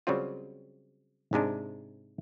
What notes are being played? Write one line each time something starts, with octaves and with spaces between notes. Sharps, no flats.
C#3 F#3 G3 C4 F4
G#2 C3 G#3 D4